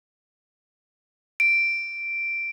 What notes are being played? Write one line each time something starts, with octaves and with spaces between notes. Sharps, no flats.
D7